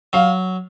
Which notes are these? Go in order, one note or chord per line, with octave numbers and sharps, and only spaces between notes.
F#3 F5